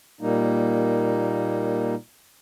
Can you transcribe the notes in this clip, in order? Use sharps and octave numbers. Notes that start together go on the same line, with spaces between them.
A#2 G3 A#3 D#4